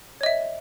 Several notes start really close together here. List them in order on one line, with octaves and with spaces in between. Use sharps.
C#5 D#5 E5